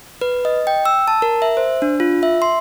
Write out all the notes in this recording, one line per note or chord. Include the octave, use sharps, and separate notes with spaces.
B4
D#5
G5
E6
A5
A#4
E5
C5
D4
F4
E5
C6